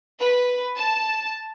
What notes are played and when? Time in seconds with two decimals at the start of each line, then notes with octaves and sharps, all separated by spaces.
0.21 B4
0.77 A5